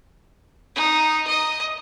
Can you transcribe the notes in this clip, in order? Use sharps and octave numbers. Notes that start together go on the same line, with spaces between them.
D#4
D#5